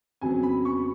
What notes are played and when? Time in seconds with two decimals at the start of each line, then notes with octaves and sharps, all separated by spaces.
0.21 F2 C#3 F#3 B3 G#5
0.43 B5
0.65 C#6